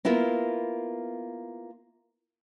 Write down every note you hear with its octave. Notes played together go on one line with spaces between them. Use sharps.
A#3 B3 E4 F4 A#4